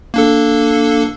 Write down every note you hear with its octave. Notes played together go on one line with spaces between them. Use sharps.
A#3 D4 A4